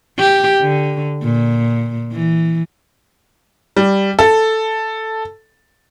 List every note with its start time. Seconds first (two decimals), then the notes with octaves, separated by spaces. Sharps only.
0.19 G4
0.62 D3
1.24 A#2
2.13 E3
3.76 G3
4.19 A4